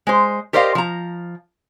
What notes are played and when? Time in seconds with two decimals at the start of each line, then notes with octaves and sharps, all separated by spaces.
0.07 G#3 C5
0.53 G4 A#4 C5 D5 D#5 F5
0.75 F3 A#5